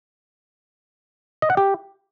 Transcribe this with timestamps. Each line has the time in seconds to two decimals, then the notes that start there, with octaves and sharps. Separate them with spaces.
1.42 D#5
1.50 F#5
1.57 G4